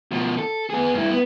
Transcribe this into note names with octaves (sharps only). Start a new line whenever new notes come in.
B2 F3
A4
B3 G#4
G2 E4
B3